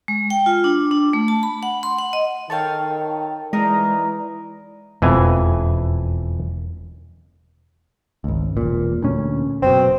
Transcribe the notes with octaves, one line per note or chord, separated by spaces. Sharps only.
G#3
G5
F4
D4
D4
A3
A5
B5
F#5
C6
F#5
D#5
D#3 A4 C#5 F5 G5 A5
E3 G#3 D#4 A#4 D5 D#5
E1 F2 B2 E3 G#5
G#1 C#2
E1 A#2
D2 A#2 C#4
F#1 B2 C4